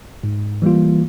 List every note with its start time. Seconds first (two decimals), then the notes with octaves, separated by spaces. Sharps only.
0.23 G#2
0.62 E3 G3 A#3 F4